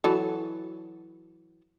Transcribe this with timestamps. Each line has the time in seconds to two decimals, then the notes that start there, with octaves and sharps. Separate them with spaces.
0.04 E3 F#3 A4